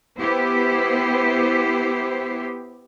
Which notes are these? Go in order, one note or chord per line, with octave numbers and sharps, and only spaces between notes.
B3 E4 G4 C5